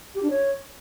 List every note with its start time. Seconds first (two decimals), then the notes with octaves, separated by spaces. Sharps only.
0.15 G4
0.23 D4
0.30 C#5